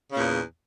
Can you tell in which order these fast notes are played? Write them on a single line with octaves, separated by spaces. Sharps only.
C#3 A#2 E2